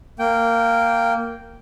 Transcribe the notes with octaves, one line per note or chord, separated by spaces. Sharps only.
A#3 G5